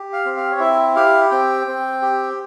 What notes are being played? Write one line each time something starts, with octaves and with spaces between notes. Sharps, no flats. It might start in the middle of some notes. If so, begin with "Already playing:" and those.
Already playing: G4
F5
C4
F5
C#5
E4 E5
G4 F5
C4 G5
C4
G4